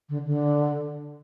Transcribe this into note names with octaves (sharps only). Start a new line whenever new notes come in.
D3
D3